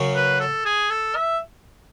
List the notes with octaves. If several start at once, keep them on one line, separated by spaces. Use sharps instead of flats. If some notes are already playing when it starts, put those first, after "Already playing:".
Already playing: F#2 C#3 F#3 C#4
B4
A4
G#4
A4
E5